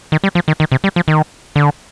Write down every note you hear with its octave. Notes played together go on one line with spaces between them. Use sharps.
D#3
G3
F3
D#3
D#3
C3
G3
F3
D#3
D3